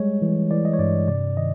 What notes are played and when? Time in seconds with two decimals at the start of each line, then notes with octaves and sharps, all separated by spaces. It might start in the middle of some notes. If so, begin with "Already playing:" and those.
Already playing: G3 G#3 C#5
0.22 E3
0.51 E3 D5
0.65 D#5
0.73 C#5
0.79 G2 D5
1.08 C3 D5
1.37 D#3 D#5